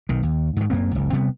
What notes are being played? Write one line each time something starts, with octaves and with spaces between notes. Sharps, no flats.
B1 D#3
D#2
G#2 D#3
F#2 A#3 C4
F#1 C#2
C3 G3 B3